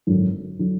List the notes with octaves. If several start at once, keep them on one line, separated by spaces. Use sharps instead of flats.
G#1 F#2 D3 F#3
D3 F#3